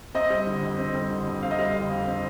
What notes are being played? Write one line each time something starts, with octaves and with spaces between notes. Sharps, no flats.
C4 D#5
G3
D3
F2
C4
G3
D3
F2
C4 F5
D#5
G3 F5
D3
F2
C4